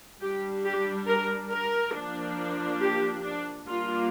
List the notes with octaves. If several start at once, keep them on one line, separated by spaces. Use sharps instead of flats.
G3 D4 G4
G4
A#4
A#4
F3 A#3 D4
G4
D4
G3 A#3 D4 F4